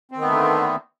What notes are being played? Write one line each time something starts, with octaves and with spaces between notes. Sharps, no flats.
D3 D#3 A3 B3 C4